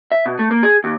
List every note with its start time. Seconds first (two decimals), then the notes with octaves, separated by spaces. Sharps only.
0.12 E5
0.26 B2
0.39 A3
0.51 A#3
0.63 G#4
0.84 D#2